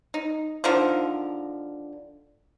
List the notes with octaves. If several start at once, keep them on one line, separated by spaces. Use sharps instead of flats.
D#4
D3 D#3 F3 A#4